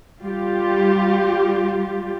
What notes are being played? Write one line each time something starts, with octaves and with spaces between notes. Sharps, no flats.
G3 F4 G4